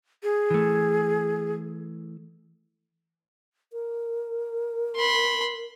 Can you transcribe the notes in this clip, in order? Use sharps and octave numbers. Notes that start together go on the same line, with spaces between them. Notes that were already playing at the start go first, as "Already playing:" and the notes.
G#4
E3 A3
A#4
B5 C6